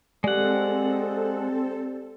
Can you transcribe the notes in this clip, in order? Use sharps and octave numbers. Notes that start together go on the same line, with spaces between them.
G#3 C4 G4 A4 D5 F#5